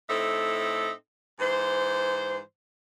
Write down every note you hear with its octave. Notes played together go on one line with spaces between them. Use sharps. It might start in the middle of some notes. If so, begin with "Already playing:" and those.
A2 C4 D#4 A4 E5
G#2 E3 C5